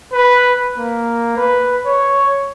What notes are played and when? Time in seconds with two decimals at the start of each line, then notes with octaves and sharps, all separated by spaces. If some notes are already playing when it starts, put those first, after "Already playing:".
0.13 B4
0.78 A#3
1.37 B4
1.86 C#5